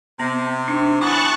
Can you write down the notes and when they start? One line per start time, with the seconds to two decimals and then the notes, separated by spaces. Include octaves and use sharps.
0.20 C3 B3
0.68 D4 D#4
1.01 E3 F#3 B3 A5 C#6 F#6